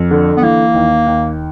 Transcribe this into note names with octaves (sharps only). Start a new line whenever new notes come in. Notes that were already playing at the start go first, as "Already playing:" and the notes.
Already playing: F2
D3
B3
E3 A#3
D#2
D#2